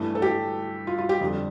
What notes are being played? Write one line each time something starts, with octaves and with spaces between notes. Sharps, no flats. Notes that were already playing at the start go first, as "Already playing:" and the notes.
Already playing: G2 E3 A3
A4
G4
F4
F4
G4
F2 D3 G3